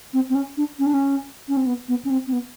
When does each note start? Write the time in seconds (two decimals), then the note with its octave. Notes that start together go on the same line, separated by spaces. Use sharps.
0.14 C4
0.30 C4
0.35 C#4
0.57 D4
0.79 C#4
0.86 D4
0.94 C#4
1.49 C#4
1.57 C4
1.66 B3
1.88 B3
2.05 C#4
2.10 C4
2.27 C4
2.33 B3